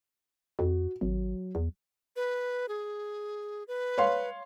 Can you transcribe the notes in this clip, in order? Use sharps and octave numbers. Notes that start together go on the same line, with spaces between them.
F2 F#4
G#1 F#3
E2
B4
G#4
B4
C#5 F5 C6